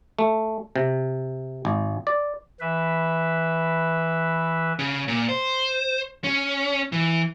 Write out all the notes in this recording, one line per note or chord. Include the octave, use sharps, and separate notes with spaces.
A3
C3
G#1
D5
E3 B4 E5
C#3
A#2
C5
C#4
E3